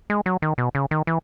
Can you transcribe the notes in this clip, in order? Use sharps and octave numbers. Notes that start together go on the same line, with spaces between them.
G#3
F#3
D#3
B2
C#3
D#3
E3